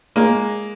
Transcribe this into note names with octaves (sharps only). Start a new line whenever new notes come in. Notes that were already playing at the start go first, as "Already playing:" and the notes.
G#3 A#3